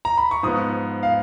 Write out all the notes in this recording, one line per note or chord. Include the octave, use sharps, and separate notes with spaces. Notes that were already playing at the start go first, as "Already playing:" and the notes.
A#5
B5
C#6
G#2 F3 B3 D#6
F5